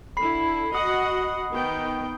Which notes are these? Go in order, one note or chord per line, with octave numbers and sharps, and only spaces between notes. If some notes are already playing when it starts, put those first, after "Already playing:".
D3 E4 B5 C7
F#4 D#5 F#5 D#6
D#3 B3 G5